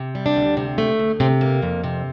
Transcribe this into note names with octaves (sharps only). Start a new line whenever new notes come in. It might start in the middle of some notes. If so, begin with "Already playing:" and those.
Already playing: C3
G3
D4
D2
C3
A3
D2
C3 C4
A#3
F2
C3